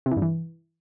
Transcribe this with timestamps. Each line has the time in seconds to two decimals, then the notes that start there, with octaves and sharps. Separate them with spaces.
0.06 C3
0.11 E3
0.17 G2
0.22 E3